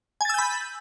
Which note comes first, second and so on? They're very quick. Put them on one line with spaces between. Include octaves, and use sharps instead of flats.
G#5 A6 E6 G6 B5